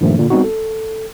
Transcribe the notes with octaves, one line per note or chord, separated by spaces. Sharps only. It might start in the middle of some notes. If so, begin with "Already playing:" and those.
G2 A#2 D#3 F3 G3 A3
A#2 D3
G3 B3 C4 D#4 F#4
A4